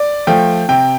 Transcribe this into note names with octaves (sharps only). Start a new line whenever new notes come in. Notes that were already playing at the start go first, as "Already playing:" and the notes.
Already playing: D5
F3 A3 G5
C3 G5